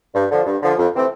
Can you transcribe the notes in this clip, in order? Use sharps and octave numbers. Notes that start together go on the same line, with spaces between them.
G2
D3 F3
G2
D3 F3
F2
C3 E3 A3 C4